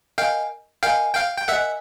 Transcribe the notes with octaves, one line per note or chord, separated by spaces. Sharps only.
A#4 D#5 F5 G5 G#5
A#4 D#5 F5 G5 G#5
F5 G5
G5
A#4 D#5 E5 F#5 G#5